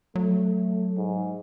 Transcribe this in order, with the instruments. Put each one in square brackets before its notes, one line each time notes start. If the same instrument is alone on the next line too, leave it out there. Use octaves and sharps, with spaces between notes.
[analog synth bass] F#3 [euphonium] A3
[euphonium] G#2